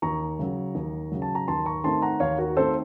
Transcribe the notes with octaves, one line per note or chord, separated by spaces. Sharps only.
D#2 A#5 C#6
C#3 F#3
D#2
C#3 F#3
A5
A#5
D#2 A5 C6
A#5 C#6
D#3 A3 C4 A5 C6
F#5 A#5
D#2 C#5 F5
F#4 A#4
D#3 A3 C4 A4 C5